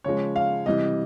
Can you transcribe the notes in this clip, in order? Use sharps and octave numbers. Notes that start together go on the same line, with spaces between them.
C#3 F3 G#3 C#5
F5
C3 E3 G3 D#5